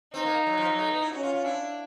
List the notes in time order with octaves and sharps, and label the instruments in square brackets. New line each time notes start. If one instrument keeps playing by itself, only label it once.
[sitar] C4 [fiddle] D#4
[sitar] A#3
F#3
F3
F#3
A3
B3
E4
[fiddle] C#4 [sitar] F#4
[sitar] F4
F4
[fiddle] D4 [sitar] E4